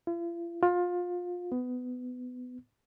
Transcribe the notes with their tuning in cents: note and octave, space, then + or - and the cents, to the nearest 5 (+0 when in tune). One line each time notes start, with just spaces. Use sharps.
F4 -45
F4 +25
B3 +20